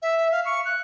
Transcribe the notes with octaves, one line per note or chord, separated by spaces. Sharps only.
E5
F5
C#6
F#6